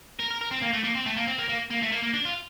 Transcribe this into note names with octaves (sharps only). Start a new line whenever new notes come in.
A#4
A#4
A#4
C4
A#3
A3
A#3
C4
A3
A#3
C4
A#3
A#3
A#3
A3
A#3
A#3
D4
F4